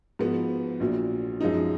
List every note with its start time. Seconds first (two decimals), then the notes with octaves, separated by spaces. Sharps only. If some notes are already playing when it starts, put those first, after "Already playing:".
0.19 G#2 F3 B3 F#4 B4
0.80 A#1 A#2 F#3
1.41 F#2 F3 G#3 D#4